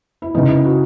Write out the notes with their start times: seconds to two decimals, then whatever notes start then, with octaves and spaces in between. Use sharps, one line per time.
0.22 E4
0.35 C#3 E3 D#4
0.49 E4
0.64 F#4